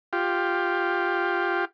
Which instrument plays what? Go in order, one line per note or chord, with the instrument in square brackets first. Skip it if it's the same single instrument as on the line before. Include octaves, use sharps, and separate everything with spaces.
[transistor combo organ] F4 G4